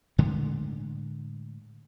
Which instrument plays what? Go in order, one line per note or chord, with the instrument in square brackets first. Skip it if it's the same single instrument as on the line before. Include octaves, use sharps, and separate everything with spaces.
[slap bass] A2 D3 G#3 A3